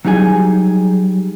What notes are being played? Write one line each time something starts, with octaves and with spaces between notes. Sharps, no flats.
F#3 G3 D#4 G#4 G#5